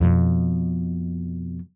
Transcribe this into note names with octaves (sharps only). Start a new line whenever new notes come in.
F2 B2